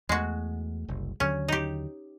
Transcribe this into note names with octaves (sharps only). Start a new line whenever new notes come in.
E2 G#3 A3 F#4
F#1 C2
D#2 D3 F#3 C#4
D#4 G4